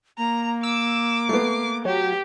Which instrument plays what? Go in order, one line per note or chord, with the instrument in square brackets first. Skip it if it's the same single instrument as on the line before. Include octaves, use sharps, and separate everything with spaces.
[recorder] A#3 [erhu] A#5
[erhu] D6 [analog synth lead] E6
[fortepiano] A3 B3 [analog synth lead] C7
[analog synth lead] F#3 [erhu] G4